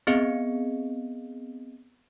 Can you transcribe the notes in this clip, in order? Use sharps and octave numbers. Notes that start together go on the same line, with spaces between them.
B3 C4 G#4 D#5 F5 C#7